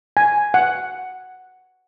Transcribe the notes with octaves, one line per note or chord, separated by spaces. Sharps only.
G#5
F#5